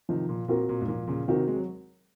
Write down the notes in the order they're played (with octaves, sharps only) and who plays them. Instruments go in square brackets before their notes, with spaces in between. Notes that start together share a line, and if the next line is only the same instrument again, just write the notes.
[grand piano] C3 D#3 [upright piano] F3
[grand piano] A#2
[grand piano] A#2 [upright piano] C4 F#4 A#4
[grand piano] A#2
G#2
[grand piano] A#2 [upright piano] F3
[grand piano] A#2 C#3
[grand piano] C3 D#3 [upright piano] C4 F#4 A#4
[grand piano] G#3
F#3